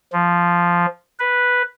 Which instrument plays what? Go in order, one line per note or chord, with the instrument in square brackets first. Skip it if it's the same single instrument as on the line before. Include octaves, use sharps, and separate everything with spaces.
[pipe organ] F3
B4